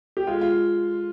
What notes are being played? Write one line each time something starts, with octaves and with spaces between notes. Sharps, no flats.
G4
G#3 F4
F4